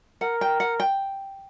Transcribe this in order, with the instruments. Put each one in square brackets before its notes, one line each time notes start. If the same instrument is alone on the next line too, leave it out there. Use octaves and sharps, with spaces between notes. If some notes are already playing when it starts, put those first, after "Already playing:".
[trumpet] A#4 [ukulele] F#5
[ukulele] G5
F#5
G5